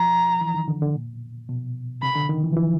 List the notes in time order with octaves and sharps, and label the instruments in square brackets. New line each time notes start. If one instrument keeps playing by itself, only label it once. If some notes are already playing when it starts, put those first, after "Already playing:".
Already playing: [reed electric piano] F3 [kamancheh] A#5
[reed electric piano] E3
D#3
D3
D3
A#2
B2
[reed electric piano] C3 [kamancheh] B5
[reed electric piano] D3
D#3
E3
F3
E3